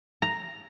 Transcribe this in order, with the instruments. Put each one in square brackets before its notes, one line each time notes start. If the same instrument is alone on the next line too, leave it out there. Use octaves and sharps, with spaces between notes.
[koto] A#5